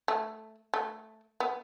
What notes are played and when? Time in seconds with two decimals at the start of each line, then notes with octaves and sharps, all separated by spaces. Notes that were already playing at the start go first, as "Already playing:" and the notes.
0.08 A3
0.74 A3
1.40 B3